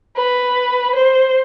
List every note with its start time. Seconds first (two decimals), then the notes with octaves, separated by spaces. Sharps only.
0.15 B4
0.96 C5